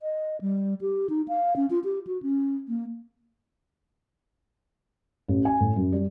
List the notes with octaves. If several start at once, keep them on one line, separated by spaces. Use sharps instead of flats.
D#5
G3
G4
D#4
F5
C#4
F4
G4
F#4
C#4
A#3
A1
G#5
A2
F#2
G3